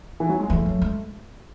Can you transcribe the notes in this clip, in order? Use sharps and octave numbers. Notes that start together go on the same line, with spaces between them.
E3
F#3
G#3
E3 A3
F#3
G#3